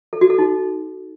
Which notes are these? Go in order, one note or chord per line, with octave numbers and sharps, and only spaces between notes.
A4
F#4
A4
D#4